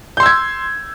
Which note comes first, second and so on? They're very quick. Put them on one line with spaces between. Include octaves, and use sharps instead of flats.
G6 C6 E6 G#6